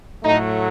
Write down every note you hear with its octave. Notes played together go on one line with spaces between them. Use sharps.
A2 F#3 A3 D#4